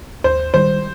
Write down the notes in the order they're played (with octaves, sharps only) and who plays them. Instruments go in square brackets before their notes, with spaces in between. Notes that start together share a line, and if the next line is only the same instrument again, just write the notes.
[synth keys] D#2 [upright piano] C5
[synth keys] D#3 G3 [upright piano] C5